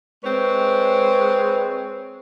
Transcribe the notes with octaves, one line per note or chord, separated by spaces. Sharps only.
G#3 C4 B4 C#5